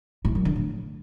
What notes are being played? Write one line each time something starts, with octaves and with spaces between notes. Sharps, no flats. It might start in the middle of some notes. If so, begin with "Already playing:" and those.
A2
F#2
D3
A2